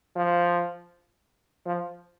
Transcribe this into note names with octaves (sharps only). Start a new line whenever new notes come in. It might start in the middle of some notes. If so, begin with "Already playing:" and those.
F3
F3